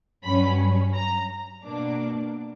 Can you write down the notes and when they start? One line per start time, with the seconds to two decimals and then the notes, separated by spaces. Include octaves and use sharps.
0.24 G2 F#3 C#4 B5
0.95 A#5
1.64 B2 A#3 D4 D6